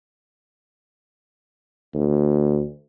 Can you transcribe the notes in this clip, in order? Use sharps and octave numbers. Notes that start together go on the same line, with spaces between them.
D2